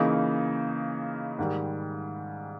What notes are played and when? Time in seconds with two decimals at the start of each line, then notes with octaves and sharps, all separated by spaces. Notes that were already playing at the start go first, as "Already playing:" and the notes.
Already playing: C#3 E3 A#3 D#4
1.39 G#2 D#3 G3